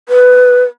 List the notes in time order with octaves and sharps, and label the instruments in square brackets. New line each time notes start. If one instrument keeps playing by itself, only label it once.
[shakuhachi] B4